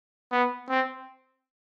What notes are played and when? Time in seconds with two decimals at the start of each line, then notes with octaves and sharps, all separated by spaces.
0.31 B3
0.69 C4